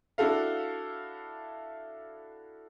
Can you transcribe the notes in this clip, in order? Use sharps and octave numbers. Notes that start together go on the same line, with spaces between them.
D4 E4 F#4 A4 F5